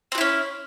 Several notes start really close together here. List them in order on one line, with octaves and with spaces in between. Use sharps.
C4 F#4 E4 C#4